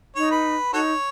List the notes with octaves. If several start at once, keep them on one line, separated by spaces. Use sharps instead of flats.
D#4 C#5
B4
D#4 F#4 A4 C#5